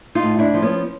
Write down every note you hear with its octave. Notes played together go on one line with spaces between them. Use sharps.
D#4 F4
A2
D4 E4
F3
B3 C#4